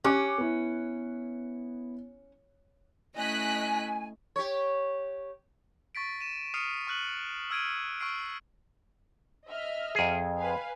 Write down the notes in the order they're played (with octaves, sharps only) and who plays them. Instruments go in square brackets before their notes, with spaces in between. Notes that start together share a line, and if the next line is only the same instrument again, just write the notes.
[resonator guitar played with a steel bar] C#4 [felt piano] G4 D6 F#6
[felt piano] B3 E4
[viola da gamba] A3 C#4 E4 [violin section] D#5 F#6 B6 [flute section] G#5
[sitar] G4 C#5
[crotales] C#6 A6 B6 D7
D#7 E7
D#6 F6 C7 C#7 D#7 F7
C#6 F6 F#6 F#7
E6 F6 G#6 D7 D#7
C#6 E6 F6 C7 D7
[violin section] D#5 E5 F6
[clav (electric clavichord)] F2 G#4
[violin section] B4 F5 G#5